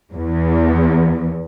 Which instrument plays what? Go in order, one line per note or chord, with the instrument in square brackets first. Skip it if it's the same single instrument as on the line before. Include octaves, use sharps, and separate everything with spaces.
[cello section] E2